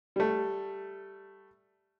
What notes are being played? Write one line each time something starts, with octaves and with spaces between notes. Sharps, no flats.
G3 A3